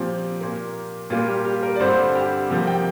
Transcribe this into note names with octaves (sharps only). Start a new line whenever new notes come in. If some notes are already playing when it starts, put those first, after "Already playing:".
Already playing: A#2 F3 C4 G4
A#2 A#3
A#2 G3 A#3 F4
G4
G4
A#4
D5
G2 D3 G3 C4 C5
G4
C3 F3 A#3 G4
G5